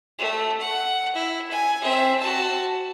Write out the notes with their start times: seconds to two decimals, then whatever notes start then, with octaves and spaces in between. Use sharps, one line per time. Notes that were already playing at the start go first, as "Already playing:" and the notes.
0.19 A3
0.60 F#5
1.15 E4
1.51 G#5
1.82 C4 E5
2.20 F#4 A5